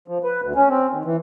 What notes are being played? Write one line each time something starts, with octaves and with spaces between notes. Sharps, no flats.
F3
B4
D2
C#4
C4
D#2
E3